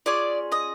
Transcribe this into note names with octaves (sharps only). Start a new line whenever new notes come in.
C#4 F4 G#4 D5 D6
D#5 D#6